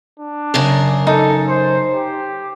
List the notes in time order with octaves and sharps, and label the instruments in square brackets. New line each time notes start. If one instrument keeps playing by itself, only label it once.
[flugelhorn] D4
[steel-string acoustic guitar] F#2 C#3 A#4
[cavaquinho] D#4 [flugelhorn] A4
[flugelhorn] C5
G4